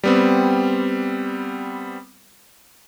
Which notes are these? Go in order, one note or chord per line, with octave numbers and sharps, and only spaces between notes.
G3 B3 C4